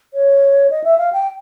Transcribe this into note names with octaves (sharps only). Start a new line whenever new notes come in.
C#5
D#5
E5
F5
G5